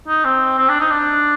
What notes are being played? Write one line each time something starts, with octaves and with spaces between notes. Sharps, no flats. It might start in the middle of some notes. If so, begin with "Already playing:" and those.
D#4
C4
C4
D4
D#4
D4